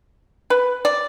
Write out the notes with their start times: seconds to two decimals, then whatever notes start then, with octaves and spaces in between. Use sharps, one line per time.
0.50 B4
0.85 D5